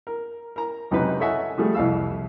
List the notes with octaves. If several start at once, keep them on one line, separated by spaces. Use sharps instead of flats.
A#4
A#4 A#5
C#2 F#2 C3 D#4 B4
A4 C#5 D#5 E5 F#5 G#5
F3 G3 A3 G#4
C2 F2 E3 F5 E6